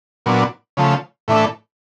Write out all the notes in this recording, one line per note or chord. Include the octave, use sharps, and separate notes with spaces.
A#2 F#3 B3 D4
C#3 F3 A3
A2 E3 A3 D4